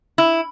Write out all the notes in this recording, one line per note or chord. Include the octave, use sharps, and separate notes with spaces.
E4